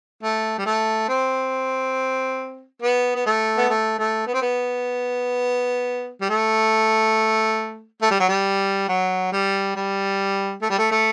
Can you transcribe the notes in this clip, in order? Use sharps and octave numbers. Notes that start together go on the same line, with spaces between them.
A3
G3
A3
C4
B3
B3
A3
B3
A3
A3
B3
C4
B3
G3
A3
A3
G3
F#3
G3
F#3
G3
G3
A3
G3
A3
A3